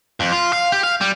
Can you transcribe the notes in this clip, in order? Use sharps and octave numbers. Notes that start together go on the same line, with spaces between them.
F2
F4
F5
G4
F5
G3